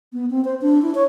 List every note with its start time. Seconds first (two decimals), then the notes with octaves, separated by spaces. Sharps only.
0.13 B3
0.30 C4
0.45 C5
0.61 D4
0.82 E4
0.95 C#5